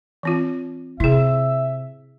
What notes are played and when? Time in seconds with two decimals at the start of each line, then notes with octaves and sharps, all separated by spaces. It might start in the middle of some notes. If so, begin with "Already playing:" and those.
0.23 E3 C4 F4
1.00 C3 E4 G#4 E5